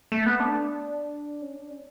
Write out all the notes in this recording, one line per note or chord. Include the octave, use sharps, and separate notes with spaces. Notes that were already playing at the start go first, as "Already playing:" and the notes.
A3
B3
D4
C#4
D4
C#4